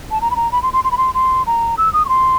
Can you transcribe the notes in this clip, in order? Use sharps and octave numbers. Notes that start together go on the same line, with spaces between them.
A5
A#5
B5
A#5
B5
C6
C6
C6
B5
C6
C6
A#5
E6
D#6
C#6
C6